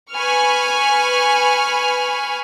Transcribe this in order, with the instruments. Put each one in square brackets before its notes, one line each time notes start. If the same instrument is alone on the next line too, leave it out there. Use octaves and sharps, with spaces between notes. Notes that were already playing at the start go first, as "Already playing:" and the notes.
[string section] B4 G#5 B5 C#6 F6